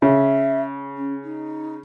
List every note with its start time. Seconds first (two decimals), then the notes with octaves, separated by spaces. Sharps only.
0.02 C#3 E5
0.97 C#4
1.24 D#4